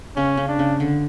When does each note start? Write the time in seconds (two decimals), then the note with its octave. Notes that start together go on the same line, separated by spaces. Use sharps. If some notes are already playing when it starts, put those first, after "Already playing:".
0.17 C#3 C#4
0.37 C#3
0.49 D4
0.59 C#3
0.80 D3